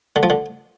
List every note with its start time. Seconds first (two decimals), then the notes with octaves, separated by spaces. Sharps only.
0.16 D3
0.23 F3
0.30 D3